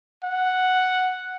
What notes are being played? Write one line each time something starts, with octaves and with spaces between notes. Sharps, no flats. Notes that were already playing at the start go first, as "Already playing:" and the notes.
F#5